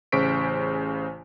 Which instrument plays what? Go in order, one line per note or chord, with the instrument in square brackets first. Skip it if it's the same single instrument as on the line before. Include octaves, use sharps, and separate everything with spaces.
[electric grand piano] A1 C#3 C5 C#6 B6 D7